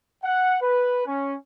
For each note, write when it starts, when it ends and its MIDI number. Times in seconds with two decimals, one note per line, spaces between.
0.24 0.56 78
0.61 1.05 71
1.06 1.35 61